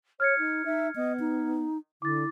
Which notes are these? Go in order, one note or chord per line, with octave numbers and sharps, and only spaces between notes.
C#5 F6 G#6 C#7
D#4
D#4 E5
B3 D#5
D#4
D3 E4 D6 A6